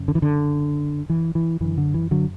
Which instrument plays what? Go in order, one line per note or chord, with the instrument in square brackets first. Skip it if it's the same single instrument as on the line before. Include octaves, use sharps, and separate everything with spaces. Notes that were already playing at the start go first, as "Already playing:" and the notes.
Already playing: [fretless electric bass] F#2 C#3
D3
E3
D3
E3
E3
F#2 D3 E3
D3
E3
D3 F#3